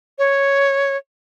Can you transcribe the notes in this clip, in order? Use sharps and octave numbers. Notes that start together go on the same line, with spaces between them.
C#5